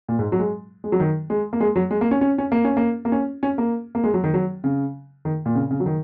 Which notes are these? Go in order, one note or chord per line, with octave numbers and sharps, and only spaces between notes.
A#2
G#2
F#3
G#3
G#3
F#3
D#3
G#3
A#3
G#3
F#3
G#3
A#3
C#4
C#4
C#4
A#3
C#4
A#3
A#3
C#4
C#4
A#3
A#3
G#3
F#3
D#3
F#3
C#3
D#3
A#2
C#3
C#3
F#3
D#3